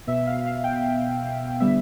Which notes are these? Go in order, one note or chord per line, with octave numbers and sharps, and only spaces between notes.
B2 B3 E5
F5
F5
G5
D3 G3 B3 E5